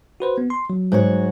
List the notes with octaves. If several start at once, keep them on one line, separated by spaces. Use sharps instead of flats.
F#4 B4 C5
B3
C6
F#3
G#2 F#4 C#5